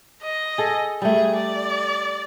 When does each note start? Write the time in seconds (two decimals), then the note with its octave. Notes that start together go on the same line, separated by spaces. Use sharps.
0.22 D#5
0.58 G#4 A4
1.02 G3 A3 G#4
1.35 D5